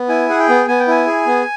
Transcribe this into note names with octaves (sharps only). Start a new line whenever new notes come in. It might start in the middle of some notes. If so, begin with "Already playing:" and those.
Already playing: B3
E4 G#5
G#4 F#5
G5
B3
B3 G#5
G5
E4 G#5
G#4
B3